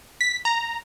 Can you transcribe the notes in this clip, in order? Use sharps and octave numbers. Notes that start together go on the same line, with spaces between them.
B6
A#5